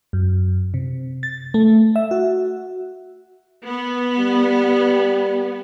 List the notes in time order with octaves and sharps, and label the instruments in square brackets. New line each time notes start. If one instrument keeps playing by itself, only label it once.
[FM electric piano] F#2
C3
A6
A3
E5
F#4
[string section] B3
[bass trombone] G3